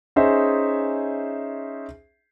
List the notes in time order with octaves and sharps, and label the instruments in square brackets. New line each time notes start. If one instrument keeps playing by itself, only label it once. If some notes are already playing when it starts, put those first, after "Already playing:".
[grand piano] C#4 D#4 G#4 C5 E5